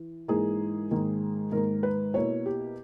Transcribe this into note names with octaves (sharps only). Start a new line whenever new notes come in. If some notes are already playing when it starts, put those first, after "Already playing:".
Already playing: E3
G#2 E3 A#3 D#4 G#4
G#2 D#3 A#3
G#2 D#3 A#3 A#4
B4
B2 A#3 E4 C#5
G4